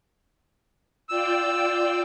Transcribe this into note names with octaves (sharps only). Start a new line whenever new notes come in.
F4 D5 G5 E6